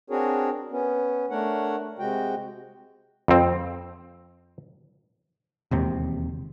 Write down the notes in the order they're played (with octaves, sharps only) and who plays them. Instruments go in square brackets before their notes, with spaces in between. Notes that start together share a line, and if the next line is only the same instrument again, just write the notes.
[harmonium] C4 D4 F#4 G#4 A#4 C#5
B3 C#4
A3 D4 A#4 C#5 F#5
C3 G#3 F#4 G5
[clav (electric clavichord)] F2 C4
[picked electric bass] E1 D#2 C3